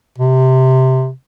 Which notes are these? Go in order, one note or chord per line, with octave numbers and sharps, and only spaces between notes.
C3